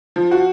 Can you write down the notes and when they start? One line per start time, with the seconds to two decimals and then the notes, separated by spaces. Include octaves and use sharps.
0.16 F3
0.31 F#4